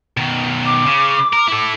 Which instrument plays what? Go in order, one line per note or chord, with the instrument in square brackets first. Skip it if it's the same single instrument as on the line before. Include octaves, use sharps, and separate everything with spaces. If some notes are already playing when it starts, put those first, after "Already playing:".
[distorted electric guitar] B2 D#3
[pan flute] D6
[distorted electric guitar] C#3
A#4
E4 A4